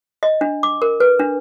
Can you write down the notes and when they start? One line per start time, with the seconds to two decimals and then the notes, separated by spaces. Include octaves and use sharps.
0.23 D#5
0.41 D4
0.63 D6
0.82 A#4
1.00 B4
1.19 D4